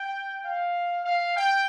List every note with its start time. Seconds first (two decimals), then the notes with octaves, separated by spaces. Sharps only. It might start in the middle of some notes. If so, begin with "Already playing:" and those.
Already playing: G5
0.45 F5
1.05 F5
1.37 G5